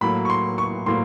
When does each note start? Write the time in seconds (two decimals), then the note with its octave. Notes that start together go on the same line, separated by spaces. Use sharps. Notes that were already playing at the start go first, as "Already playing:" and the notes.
0.01 A2 F#3 A#3 B5
0.25 C#6
0.30 C6
0.58 C#6
0.86 A2 F#3 A#3 C6